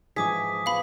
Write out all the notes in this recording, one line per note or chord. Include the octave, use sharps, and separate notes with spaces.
G#2 E3 F3 G#4 D6 D#6 B6
B3 F5 B5